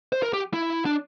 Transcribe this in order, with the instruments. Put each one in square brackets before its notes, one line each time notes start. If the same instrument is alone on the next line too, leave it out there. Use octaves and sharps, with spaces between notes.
[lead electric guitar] C5
A#4
G4
E4
D4